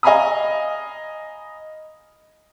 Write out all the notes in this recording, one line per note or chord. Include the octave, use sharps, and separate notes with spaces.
D#5 F5 G#5 A#5 B5 D#6